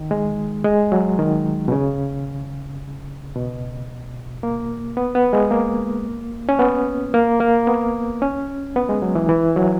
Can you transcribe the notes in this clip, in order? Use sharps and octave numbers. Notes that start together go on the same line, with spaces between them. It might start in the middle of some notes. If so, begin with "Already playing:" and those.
Already playing: D#3
G#3
G#3
F#3
D#3
B2
C#3
B2
A#3
B3
B3
G#3
A#3
C#4
B3
A#3
A#3
B3
C#4
B3
G#3
F#3
E3
E3
F#3